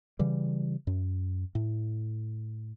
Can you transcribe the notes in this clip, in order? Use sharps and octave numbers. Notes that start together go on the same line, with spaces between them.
C#3 E3 G3
F#2
A2